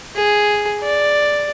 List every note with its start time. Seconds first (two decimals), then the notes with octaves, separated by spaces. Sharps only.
0.16 G#4
0.83 D5